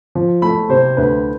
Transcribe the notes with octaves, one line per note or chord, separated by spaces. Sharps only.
F3
A3 B5
C3 C5
D2 B4